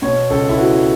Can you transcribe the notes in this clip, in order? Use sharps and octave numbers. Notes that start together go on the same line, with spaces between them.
B2 C#5
C#2 A4
E4
B3 F#4